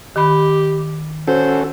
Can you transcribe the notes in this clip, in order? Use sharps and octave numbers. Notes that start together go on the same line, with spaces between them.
D#3 G4 B5
C#4 F#4 A4 C5